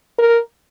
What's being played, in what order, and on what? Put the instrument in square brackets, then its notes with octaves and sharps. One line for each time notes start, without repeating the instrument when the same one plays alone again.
[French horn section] A#4